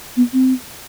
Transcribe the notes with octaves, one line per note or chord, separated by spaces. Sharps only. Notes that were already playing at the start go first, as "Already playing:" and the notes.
B3
C4